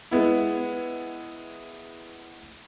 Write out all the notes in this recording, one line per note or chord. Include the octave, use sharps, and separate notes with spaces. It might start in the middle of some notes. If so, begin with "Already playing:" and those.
G#3 B3 E4